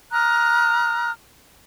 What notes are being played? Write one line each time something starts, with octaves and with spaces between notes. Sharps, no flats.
A#5 D#6 F6 F#6